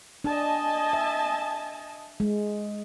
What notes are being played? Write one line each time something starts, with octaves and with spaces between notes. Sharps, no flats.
D4 D#5 G#5 A5
E5
G#3